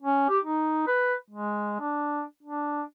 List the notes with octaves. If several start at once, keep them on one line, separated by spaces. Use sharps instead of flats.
C#4
G4
D#4
B4
G#3
D4
D4